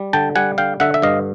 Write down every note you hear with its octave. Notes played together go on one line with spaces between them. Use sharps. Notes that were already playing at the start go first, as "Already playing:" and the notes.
Already playing: G3
D3 G5 A5
G3 F#5 G#5
D3 F5 G5
D3 E5 F#5
E5
G2 D#5 F5